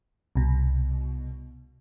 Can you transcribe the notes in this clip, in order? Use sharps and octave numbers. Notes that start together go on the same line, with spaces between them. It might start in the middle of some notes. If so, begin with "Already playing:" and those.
C2 B2